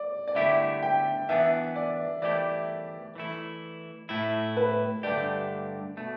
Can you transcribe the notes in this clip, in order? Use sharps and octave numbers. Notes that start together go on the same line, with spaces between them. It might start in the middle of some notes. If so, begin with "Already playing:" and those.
Already playing: D5
D5
D3 A3 E4 G4 E5
G5
E3 B3 D4 E5
D5
E3 A3 E4 G4 D5
E3 A3 E4
A2 A3 E4
B4
G2 D3 A3 G4 D5
B2 A3